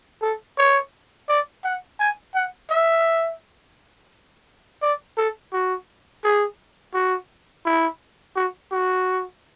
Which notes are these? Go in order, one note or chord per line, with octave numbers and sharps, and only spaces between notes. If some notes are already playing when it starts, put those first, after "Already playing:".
A4
C#5
D5
F#5
G#5
F#5
E5
D5
A4
F#4
G#4
F#4
E4
F#4
F#4